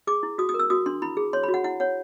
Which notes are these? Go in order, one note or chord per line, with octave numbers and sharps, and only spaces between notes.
G#4 D6
E4
F#4 D#6
D#6
A#4
E6
F#4 D#6
D4 C6
E4 B5
G#4
C#5 C6
B5
F#4
F#5
E4 F#5
C#5 F#5